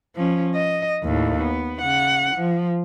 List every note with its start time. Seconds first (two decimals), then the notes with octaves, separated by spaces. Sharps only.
0.16 F3 C#4
0.55 D#5
1.04 D#2 A2
1.42 B3
1.82 C#3 F#5
2.36 F3